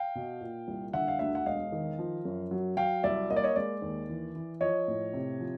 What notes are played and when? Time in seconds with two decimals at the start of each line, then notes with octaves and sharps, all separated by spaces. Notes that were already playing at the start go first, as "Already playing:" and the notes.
Already playing: F5 G5
0.15 B2
0.41 A#2
0.68 C2
0.93 D3 E5 F#5
1.08 F5
1.19 D2 E5 F#5
1.35 F#5
1.46 E1 D#5 F5
1.72 D#3
1.99 F3
2.25 F#2
2.51 F#3
2.77 F#3 F5 G5
3.03 C2 D5 E5
3.30 A#3 D#5
3.36 D5
3.43 C#5 D#5
3.56 G#3 D5
3.82 D#2
4.09 E3
4.35 E3
4.61 F3 C#5 D#5
4.88 A2
5.13 C3
5.40 F3